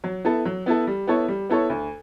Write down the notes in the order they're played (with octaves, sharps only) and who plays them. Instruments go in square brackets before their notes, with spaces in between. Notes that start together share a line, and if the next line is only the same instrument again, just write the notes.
[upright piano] F#3
B3 E4 A4
F#3
B3 E4 A4
G3
B3 E4 A4 C#5
G3
B3 E4 A4 C#5
D2